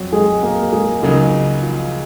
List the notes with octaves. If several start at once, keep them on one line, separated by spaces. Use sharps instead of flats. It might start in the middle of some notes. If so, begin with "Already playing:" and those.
Already playing: F2 F#3 F#4
G#3 G#4
A#3 A#4
G#3 G#4
C#2 C#3 F#3 G#3 A#3 D#4 G#4
F3 F4